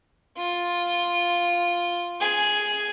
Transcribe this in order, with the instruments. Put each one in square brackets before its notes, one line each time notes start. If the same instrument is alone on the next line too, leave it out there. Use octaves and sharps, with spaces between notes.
[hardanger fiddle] F4
G#4